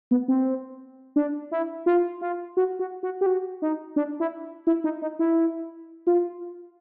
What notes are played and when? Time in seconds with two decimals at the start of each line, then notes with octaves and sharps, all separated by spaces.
0.11 B3
0.28 C4
1.16 D4
1.51 E4
1.86 F4
2.21 F4
2.57 F#4
2.79 F#4
3.03 F#4
3.21 G4
3.26 F#4
3.62 D#4
3.96 D4
4.20 E4
4.67 E4
4.84 D#4
5.02 D#4
5.19 E4
6.07 F4